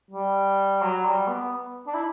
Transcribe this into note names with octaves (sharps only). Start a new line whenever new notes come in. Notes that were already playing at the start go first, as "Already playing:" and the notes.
G3
F#3
G3
B3
D4
E4